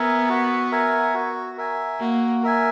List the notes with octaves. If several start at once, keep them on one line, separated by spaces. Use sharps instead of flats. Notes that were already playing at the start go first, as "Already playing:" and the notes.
Already playing: B3 A#4 E5 G#5
F#4
A#4 E5 G#5
F#4
A#4 E5 G#5
A#3 F#4
A#4 E5 G#5